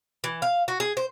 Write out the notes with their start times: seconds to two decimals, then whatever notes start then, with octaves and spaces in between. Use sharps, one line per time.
0.24 E3
0.42 F5
0.68 F#4
0.80 G#4
0.97 C5